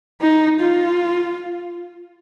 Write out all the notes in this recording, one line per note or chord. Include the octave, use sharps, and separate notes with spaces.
D#4
F4